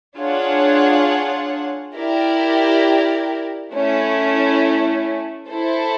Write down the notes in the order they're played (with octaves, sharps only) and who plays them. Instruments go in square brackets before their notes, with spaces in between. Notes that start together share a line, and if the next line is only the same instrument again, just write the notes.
[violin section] D4 F4 G#4 C#5 F#5
E4 G4 A#4 D5
A3 C#4 E4
E4 A4 C5